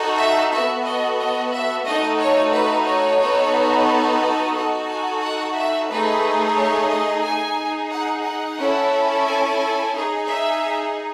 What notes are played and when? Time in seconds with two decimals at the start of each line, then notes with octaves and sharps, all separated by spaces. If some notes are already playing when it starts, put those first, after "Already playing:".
Already playing: D#4 F#4 A4
0.16 E5
0.50 B3 F#4 A4 E5
0.83 D#5
1.16 D#5
1.51 E5
1.84 A3 D#4 F#4 A4 D#5
2.17 C#5
2.52 B4
2.85 C#5
3.19 B3 D#4 F#4 A4
4.20 D#5
4.54 D#4 F#4 A4
4.88 G#5
5.21 F#5
5.55 E5
5.89 A3 D#4 G#4 B4
6.56 C#5
6.90 D#5
7.23 D#4 G#4 G#5
7.91 F#5
8.25 F#5
8.59 C#4 E4 A4
9.26 G#5
9.94 D#4 G#4
10.27 E5